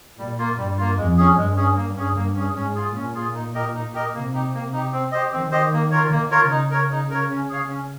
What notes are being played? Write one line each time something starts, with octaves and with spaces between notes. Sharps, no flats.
A#2 G3
A#3 F4
G2 G3
A#3 F4
F2 G#3
C#4 G#4
G2 G#3
C#4 G#4
A#3
C#4 G#4
G2 A#3
C#4 G#4
G#2 C#4
F4 G#4
A#2 C#4
F4 G#4
D#4
G4 A#4 D#5
D#4
G4 A#4 D#5
C3 A#3
D#4 G4
A#3
D#4 G4
C4
G4 C5 D#5
D#3 C4
G4 C5 D#5
A#3
F4 A#4 C#5
D#3 A#3
F4 A#4 C#5
C#3 D#4
A#4 C#5
D#4
A#4 C#5
C#4
G#4 C#5 F5
C#4